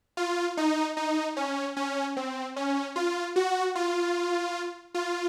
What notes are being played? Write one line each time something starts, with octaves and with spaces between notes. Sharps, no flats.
F4
D#4
D#4
C#4
C#4
C4
C#4
F4
F#4
F4
F4